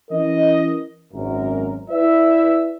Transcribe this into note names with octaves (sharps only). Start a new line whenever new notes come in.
E3 C#4 A#4 D#5
G#1 F#2 A#4
E4 B4 D5 E5